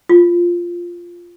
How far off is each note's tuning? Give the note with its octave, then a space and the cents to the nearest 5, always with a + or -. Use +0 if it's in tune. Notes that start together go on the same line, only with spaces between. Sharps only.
F4 -5